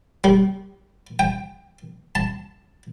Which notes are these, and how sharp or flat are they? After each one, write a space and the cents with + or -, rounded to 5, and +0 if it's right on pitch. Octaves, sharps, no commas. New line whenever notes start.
G3 -20
G5 +20
A5 +5